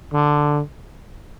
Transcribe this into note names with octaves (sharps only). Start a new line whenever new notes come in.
D3